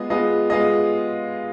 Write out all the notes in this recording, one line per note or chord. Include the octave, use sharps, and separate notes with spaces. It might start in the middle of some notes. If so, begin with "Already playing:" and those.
Already playing: G#3 B3 F4 G#4 D#5
G#3 B3 F4 G#4 D#5
G#3 B3 F4 G#4 D#5